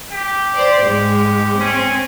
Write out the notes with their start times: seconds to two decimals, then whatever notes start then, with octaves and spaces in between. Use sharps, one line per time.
0.13 G4
0.56 C5 D5
0.86 G#2 G#3
1.60 C4 C#4